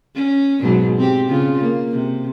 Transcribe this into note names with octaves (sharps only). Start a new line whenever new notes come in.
C#4
G#2 B2 F#3
C4 G4
C#3 F4
A#3
C3